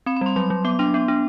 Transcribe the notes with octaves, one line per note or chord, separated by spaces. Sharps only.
C4 B5
B5
G3 C6
F#3 C6
F#3
B3 D6
D4 C6
B3
D4